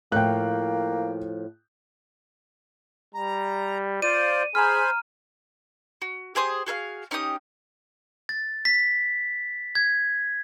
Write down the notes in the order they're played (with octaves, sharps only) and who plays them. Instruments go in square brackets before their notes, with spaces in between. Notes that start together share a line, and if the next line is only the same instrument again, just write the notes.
[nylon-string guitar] A2 F3 [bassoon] A#3 [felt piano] G5 F#6
[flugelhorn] G3 [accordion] A#5
[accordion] F4 C5 [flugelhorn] D5 [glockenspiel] D#7
[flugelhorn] G#4 [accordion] C5 G#5 B5 [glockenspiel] A#5 F6
[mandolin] F#4
G4 G#4 C5 D#6
F#4 G#4 A4 F5
C#4 D#4 G4 D#6
[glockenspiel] A6
B6
G#6